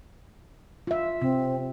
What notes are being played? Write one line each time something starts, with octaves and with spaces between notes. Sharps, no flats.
F4 E5
C3 C4